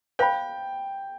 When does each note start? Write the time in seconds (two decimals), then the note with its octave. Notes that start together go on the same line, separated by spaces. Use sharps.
0.19 C5 F5 G5 B5